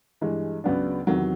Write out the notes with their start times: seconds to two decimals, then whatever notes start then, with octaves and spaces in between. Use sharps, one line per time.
0.21 G2 E3 G#3
0.64 C#2 C#3 F#3 B3 D4
1.07 E2 C3 D#3 F#3